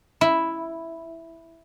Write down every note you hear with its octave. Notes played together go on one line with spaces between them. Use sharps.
E4